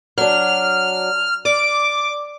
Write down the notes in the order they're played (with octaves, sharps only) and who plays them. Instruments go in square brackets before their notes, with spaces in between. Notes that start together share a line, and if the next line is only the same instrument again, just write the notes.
[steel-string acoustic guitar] F#3 D4 [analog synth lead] F6
[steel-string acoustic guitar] D5 [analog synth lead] D6